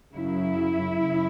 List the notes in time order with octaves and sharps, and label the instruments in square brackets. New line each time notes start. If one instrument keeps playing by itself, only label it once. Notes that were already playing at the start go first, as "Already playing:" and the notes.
[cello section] F#2 C#3 F#3 E4
F#2 C#3